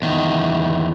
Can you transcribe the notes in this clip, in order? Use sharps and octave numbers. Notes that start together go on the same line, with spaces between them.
E2 D#3